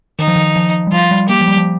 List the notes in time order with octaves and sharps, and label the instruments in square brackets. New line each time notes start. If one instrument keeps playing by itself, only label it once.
[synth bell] D#3 [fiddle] D#4
[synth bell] F3
D#3
F3
G3
[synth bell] F3 [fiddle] F4
[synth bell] G3
[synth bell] A#3 [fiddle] G4
[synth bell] F3
G3
F3